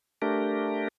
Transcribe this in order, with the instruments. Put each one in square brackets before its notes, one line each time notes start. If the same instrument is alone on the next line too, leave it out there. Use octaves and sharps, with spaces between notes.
[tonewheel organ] A3 D4 G4 A#4